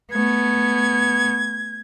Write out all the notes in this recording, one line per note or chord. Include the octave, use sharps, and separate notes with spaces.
A3 B3 G#6